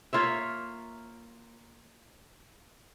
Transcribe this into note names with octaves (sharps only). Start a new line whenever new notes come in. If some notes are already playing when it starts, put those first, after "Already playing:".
A#3 F4 C#5 E5